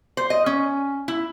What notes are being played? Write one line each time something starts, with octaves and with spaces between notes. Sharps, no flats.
C5
D#5
C#4
E4